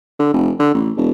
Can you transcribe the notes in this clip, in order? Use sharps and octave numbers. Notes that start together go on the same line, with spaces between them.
D3
F1
D3
A1
E1